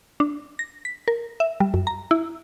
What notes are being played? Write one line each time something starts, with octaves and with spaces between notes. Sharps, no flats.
D4
A#6
B6
A#4
E5
G3
F#2
A#5
E4